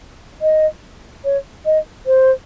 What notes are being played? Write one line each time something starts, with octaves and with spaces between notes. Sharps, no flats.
D#5
C#5
D#5
C5